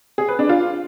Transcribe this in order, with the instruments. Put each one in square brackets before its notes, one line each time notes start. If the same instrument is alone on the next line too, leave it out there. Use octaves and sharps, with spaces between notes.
[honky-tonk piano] G#4
B4
D4
F4